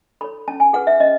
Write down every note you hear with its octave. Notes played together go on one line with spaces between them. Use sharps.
A4 C#5 B5
C#4 A5
G#5
G#4 B4 F#5
E5
C#4 D#5